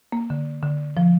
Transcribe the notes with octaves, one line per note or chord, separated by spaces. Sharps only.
A#3
D3
D3
F3